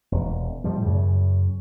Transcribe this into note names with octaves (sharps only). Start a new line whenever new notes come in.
E1
A2 F3 G3
F#2 C#3